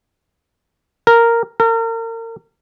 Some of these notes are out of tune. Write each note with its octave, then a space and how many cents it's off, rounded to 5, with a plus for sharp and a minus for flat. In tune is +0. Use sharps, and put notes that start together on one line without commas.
A#4 -5
A#4 -35